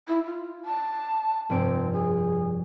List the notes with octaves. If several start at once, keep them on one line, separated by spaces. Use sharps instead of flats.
E4
F4
A5
F1 G2 C4 D7
G#4